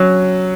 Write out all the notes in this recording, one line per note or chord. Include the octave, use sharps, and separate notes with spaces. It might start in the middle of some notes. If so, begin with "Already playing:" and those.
Already playing: F#3 C#4